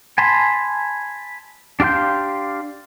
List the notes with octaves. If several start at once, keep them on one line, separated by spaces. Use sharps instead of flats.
G#5 A5 B5 C6
D4 G4 F5 C6 G6